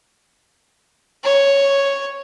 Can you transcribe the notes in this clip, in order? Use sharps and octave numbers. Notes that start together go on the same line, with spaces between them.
C#5